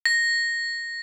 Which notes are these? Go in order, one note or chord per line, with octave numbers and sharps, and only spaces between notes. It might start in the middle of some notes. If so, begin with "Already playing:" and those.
A#6